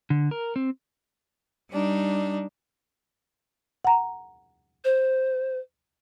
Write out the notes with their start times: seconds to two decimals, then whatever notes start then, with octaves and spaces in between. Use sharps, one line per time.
0.10 D3
0.31 A#4
0.56 C4
1.71 G3 D4 D#4
3.85 F#5 A#5
4.85 C5